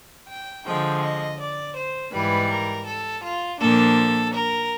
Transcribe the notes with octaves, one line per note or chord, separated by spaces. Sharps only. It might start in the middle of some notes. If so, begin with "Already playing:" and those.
G5
D3 F3 G#3 G5
D#5
D5
C5
G#2 E3 G3 B4
A#4
A4
F4
A#2 F3 A#3 D4 A4
A#4